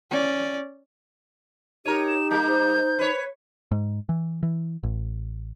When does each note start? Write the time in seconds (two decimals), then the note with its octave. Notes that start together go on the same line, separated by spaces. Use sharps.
0.11 C#4 D5
1.86 D#4 G4 A#4 C#5 D#7
2.08 E7
2.31 G3 A#3 G6
2.48 C5
2.99 B4 C#5
3.71 G#2
4.09 E3
4.43 E3
4.83 A1